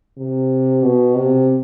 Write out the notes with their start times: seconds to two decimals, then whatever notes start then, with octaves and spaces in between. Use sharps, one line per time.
0.18 C3
0.83 B2
1.15 C3